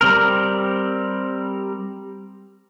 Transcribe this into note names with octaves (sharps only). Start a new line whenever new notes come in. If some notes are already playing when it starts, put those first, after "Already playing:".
G3 C4 A#4